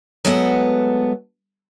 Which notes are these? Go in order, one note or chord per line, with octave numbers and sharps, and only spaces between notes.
F#3 G#3 A3 B3 A4 F#5